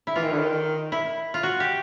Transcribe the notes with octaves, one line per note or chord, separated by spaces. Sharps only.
E4
E3 F4
D#3
D3
D#3
E4
F4
F#4
G4